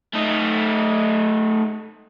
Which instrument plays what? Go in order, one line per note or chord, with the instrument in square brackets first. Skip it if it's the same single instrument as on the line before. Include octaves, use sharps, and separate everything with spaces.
[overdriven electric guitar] A3 D#4